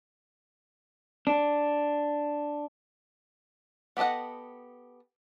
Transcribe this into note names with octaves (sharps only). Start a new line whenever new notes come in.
D4
B3 G4 A4 D#5 F#5